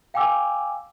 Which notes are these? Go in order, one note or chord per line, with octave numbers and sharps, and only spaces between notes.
F5 G5 G#5 D6 E6